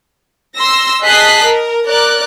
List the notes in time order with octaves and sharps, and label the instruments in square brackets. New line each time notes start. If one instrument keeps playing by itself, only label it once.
[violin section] C6 E6 A#6
G#4 D#5 A5 F#6 B6 C7
A#4
A#4 D5 F#6